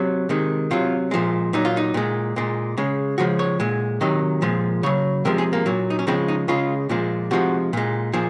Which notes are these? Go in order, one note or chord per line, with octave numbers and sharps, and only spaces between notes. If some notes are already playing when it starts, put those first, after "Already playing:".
Already playing: C3 F#3
C3 D#3 G#3
C3 F#3 F4
A#2 F3 G#3
A#2 F#3 D#4
F4
D#4
A#2 G#3
A#2 G#3
C#3 G#3
C#3 F3 G#3 F#4
C#5
A#2 G#3
C3 D#3 F#3 D#5
A#2 F3 G#3
C#3 F#3 C#5
C3 F3 G#3 A#4
G#4
A#3
A#2 F#3
D#4
C#4
C#3 F3 G#3 C4
D#4
C#3 G#3 F4
A#2 F3 G#3
C3 F3 G#3 F#4
A#2 G#3
A#2 F3 G#4